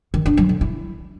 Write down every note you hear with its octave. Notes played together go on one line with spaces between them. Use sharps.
D#3
D4
F#3
D3
E4